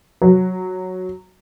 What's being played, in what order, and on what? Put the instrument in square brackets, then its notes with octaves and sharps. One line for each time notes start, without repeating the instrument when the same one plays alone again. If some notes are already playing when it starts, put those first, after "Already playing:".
[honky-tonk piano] F#3